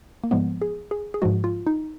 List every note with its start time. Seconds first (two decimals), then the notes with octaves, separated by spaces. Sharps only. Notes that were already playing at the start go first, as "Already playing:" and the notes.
0.24 A#3
0.31 G#2 F3 G#3 B3
0.62 G#4
0.91 G#4
1.14 G#4
1.22 G#2 F3 G#3 F#4
1.44 F4
1.67 D#4